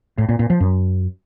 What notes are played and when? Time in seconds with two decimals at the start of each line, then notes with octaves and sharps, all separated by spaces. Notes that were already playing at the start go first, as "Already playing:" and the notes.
0.18 A2
0.29 A#2
0.39 A#2
0.50 F3
0.60 F#2